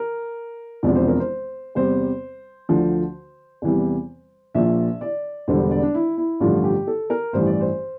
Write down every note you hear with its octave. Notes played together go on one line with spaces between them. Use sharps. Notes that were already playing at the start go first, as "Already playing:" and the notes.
Already playing: A#4
E1 E2 C3 F3 D5
C5
A#4
C5
E2 C3 G3 C5
D2 D3 F3
E2 C3 E3 G3
A#1 A#2 F3 E5
D5
E1 E2 D3 G3 C5
D5
D4
E4
E4
A1 G2 D3 F3 F4
G4
A4
A#4
A1 G2 E3 C5
D5
C5